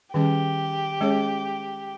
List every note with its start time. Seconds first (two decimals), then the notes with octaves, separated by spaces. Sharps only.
0.14 D#3 G3 C#4 G4 G#4
1.01 G#3 C#4 G#4 C#5